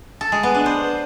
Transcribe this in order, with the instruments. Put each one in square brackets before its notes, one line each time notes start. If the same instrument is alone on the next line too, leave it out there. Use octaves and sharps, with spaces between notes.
[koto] A4
G#3
B3
D4
C5